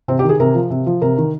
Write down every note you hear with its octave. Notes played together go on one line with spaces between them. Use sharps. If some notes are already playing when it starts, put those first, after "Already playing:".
C3 C4
G4
D#3
G#4
C3 A#4
F3
C3
F3
C3 A#4
D#3